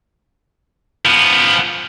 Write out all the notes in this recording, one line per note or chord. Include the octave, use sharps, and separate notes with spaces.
F3 B3